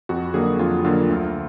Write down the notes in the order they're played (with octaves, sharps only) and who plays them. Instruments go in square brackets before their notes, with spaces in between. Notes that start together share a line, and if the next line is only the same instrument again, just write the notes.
[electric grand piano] F2 F#4
D3 F#3 A#3 G#4
F2 F4
D3 F#3 A#3 F4
D2